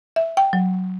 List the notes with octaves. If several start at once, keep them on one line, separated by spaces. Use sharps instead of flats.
E5
G5
F#3